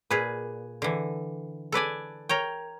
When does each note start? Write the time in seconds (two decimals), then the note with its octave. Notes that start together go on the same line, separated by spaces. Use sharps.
0.11 A#2 G#4 B4
0.82 D3 E3
1.72 A4 B4 D5 G#5
2.29 A#4 C#5 G5